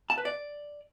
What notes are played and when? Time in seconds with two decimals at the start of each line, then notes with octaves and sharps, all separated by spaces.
0.10 A5
0.18 B4
0.25 D5